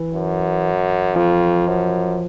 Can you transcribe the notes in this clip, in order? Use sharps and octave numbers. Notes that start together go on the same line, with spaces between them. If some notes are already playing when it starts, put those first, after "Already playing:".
Already playing: E3
F#2
F2 F3
F#2